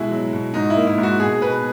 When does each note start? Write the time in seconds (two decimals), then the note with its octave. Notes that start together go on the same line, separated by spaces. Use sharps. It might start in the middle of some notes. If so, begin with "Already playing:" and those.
Already playing: B2 G#3 E4
0.11 F#3
0.33 B2
0.54 G#2 D#4
0.70 E4
0.76 A#3
0.87 E4
0.98 G#2
1.03 F#4
1.19 B2 G#4
1.42 B2 B4